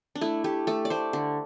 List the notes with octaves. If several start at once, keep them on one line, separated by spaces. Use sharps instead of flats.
D4
A3 E4
A3 G4
A3 A4
D5
A3 C5
D3